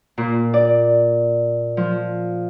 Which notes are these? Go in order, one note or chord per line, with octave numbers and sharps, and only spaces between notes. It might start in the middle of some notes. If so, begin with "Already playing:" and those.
A#2
D5
F3